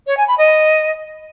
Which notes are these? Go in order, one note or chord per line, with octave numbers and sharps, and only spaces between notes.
C#5
G#5
B5
D#5